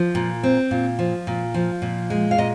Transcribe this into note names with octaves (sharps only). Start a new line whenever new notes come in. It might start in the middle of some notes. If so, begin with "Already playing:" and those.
Already playing: F3
A#2
C4
A#2
F3
A#2
F3
A#2
G#3
F5
A#2 D#5